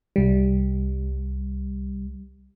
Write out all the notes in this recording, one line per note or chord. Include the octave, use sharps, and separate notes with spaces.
C2 G3